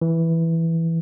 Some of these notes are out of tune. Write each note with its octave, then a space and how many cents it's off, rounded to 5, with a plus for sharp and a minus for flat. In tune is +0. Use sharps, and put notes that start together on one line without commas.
E3 +0